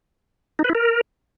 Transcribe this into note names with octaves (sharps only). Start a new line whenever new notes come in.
D#4
B4
E4
A#4